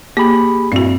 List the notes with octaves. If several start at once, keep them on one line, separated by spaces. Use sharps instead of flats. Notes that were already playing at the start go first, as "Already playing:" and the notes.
A#3 G4 G#4 B5
G2 A#2 C4 E4 F#4